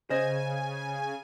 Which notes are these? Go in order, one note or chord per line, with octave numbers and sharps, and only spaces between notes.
C#3 C5 D#5 G#5